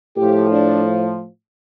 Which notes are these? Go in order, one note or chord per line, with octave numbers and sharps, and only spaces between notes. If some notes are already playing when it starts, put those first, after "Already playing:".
A2 F3 G4
D4